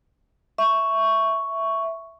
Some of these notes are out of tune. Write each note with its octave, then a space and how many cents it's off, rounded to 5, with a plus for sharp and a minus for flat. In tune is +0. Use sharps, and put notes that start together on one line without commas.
E5 +0 C#6 +5